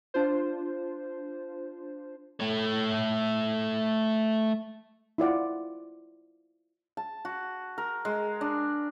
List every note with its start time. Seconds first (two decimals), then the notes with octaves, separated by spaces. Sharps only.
0.14 D4 F4 C5
2.40 A3 C#5
5.18 E4 F4 D5 F#5
6.97 A5
7.25 F#4
7.78 A#4
8.05 G#3
8.41 D4